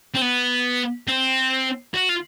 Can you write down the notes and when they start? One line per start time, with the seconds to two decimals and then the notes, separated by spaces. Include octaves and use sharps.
0.14 C4
0.22 B3
1.08 C4
1.94 F#4
2.09 F4